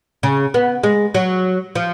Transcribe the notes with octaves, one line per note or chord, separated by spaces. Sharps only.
C#3
B3
G#3
F#3
F3